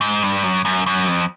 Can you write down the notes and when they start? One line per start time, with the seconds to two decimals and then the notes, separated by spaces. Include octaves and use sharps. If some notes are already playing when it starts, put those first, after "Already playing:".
0.01 G#2
0.23 G2
0.43 F#2
0.65 F#2
0.86 F#2
1.08 F2